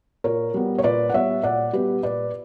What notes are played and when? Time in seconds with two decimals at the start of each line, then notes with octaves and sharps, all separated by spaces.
0.24 A#2 A#4 C#5
0.54 G3 B3
0.78 C#5
0.83 A#2 B4 D5
1.09 F#5
1.14 G3 B3 C#5 E5
1.43 A#2 D5 F#5
1.73 G3 B3 G4 B4
2.03 A#2 B4 D5